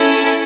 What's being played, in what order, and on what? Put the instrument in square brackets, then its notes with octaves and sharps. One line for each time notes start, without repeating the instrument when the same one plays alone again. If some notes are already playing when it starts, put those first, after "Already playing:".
Already playing: [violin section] C#4 E4 A4